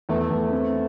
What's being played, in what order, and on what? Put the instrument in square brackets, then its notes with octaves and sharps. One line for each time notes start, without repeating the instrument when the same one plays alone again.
[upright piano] E2 [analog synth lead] A3
[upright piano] E2
C4